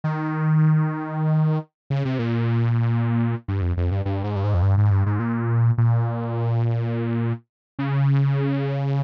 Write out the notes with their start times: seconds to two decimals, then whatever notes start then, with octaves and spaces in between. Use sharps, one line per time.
0.04 D#3
1.90 C#3
2.05 C3
2.19 A#2
3.48 G2
3.62 F2
3.77 F2
3.91 G2
4.05 G2
4.24 G#2
4.36 G2
4.44 G#2
4.54 F2
4.62 G2
4.77 G#2
4.91 G2
5.06 G#2
5.19 A#2
5.78 A#2
7.79 C#3